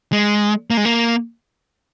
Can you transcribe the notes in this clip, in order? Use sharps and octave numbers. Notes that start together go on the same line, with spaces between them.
G#3
A#3
G#3
A#3